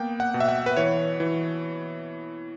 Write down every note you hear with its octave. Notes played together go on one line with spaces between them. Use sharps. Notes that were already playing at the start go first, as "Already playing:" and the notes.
Already playing: A#3 B3 G5
F#5
B2
E5
F#5
B4
E3 C#5
E3